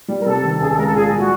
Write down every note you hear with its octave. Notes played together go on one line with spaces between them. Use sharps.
G3
A#4
C3 A4
D#3
C#2 G#4
A4
G#3 A#4
A4
A#2 G#4
G3
F#4